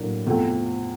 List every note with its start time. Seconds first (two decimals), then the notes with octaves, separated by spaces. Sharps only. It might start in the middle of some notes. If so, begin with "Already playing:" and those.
Already playing: A2 F#3 A#3 D4
0.26 E2 C3 F3 A3 C4